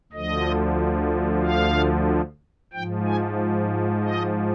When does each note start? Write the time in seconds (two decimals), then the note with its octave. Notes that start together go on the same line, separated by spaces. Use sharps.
0.12 D2 D3 F3 D#5
1.43 F5
2.73 G#2 F3 G5
3.06 G#5
4.03 D#5